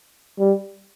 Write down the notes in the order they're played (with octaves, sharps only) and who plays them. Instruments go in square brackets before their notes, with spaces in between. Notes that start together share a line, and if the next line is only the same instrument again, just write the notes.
[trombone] G3